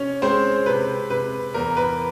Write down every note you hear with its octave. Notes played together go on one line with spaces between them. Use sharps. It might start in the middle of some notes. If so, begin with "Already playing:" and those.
Already playing: C3 C#4 C#5
G#3 C4 C5
C3 B4
C3 B4
E2 A#4
B4